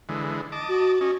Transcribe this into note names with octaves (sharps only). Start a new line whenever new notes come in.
D3 E3 G#3
D#5 A5 D6
F#4
C#4 F#4 D#5